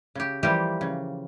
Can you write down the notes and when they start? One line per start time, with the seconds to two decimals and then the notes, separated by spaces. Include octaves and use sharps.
0.15 C#3 G4
0.43 E3 F3 G3 A#3 G4 A#4
0.81 C#3